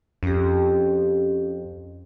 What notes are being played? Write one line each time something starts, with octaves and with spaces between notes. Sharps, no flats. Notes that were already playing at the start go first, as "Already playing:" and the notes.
F2 C#4 G4